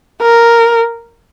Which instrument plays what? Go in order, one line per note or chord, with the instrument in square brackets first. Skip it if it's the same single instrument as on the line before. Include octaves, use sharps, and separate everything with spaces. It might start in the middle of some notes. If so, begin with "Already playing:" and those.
[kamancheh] A#4